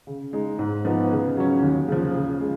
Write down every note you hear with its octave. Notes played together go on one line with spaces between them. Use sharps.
C#3
G#3 D#4
G#2
F3 B3 D#4
C#3
F#3 C#4
D#2
C#3 F3
C#3
G#3